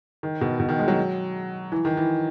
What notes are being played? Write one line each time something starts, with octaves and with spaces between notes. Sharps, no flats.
D#3
B2
B2
D#3
G#3
F#3
E3
D#3
E3